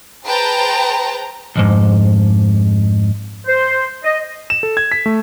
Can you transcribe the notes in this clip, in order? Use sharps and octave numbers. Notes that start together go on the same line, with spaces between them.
G#4 B4 C5 G5 A5 A#5
B1 F2 G#2
C5
D#5
E7
A4
G#6
B6
A3